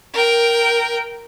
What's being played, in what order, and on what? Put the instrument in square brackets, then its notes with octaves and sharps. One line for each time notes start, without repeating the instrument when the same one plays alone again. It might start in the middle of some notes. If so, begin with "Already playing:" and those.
[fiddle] A#4 G5